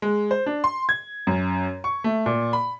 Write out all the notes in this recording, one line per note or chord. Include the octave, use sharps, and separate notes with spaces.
G#3
C5
D4
C6
G#6
F#2
C#6
A3
A#2
B5